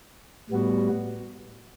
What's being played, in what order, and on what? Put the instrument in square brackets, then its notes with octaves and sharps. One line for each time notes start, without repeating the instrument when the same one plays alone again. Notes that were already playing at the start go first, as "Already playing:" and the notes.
[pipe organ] A2 G3 B3 F#4